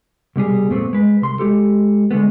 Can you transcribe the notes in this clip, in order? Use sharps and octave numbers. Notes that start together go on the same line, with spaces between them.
C2 B2 G3 G#4
F2 A#2 A3 B3 C4
G#3 B4
C2 C6
G#3 G4 A4
D3 G#3 A3 B3